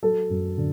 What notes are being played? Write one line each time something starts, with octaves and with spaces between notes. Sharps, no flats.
F#3 A4
F#2
D3